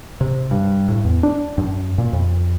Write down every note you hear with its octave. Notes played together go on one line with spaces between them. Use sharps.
C3
G2
A2
E2
D4
F#2
A#2
F2